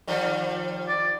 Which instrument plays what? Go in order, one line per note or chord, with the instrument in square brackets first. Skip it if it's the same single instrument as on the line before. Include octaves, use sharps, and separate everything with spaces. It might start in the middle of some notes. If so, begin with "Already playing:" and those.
[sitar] D#3 F3 G3
[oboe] D5